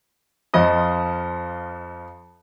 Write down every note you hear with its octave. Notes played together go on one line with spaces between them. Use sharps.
F2 F3 F4 D#5 D#6